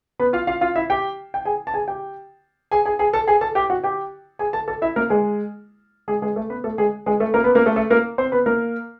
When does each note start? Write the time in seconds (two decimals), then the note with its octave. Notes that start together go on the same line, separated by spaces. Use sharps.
0.20 B3 B4
0.33 F4 F5
0.47 F4 F5
0.61 F4 F5
0.76 E4 E5
0.90 G4 G5
1.34 G5
1.45 G#4 G#5
1.67 A5
1.74 G#4 G#5
1.88 G4 G5
2.72 G#4 G#5
2.85 G#4 G#5
2.99 G#4 G#5
3.13 A4 A5
3.27 G#4 G#5
3.41 A4 A5
3.55 G4 G5
3.70 F#4 F#5
3.83 G4 G5
4.39 G#4 G#5
4.53 A4 A5
4.68 A4 A5
4.82 E4 E5
4.96 A#3 A#4
5.10 G#3 G#4
6.08 G#3 G#4
6.22 G#3 G#4
6.36 A3 A4
6.50 B3 B4
6.64 A3 A4
6.78 G#3 G#4
7.06 G#3 G#4
7.20 A3 A4
7.34 A#3 A#4
7.44 B3 B4
7.55 A#3 A#4
7.66 A3 A4
7.76 A3 A4
7.90 A#3 A#4
8.18 C4 C5
8.32 B3 B4
8.46 A#3 A#4